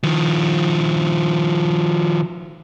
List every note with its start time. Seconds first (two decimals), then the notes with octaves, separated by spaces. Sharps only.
0.04 D#3 F3